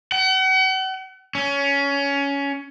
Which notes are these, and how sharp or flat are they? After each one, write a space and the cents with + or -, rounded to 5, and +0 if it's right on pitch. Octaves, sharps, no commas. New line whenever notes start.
F#5 +40
C#4 +15